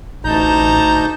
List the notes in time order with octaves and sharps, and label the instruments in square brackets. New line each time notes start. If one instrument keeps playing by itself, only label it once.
[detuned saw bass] A1 [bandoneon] D2 D#4 G6 [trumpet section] A5 A#5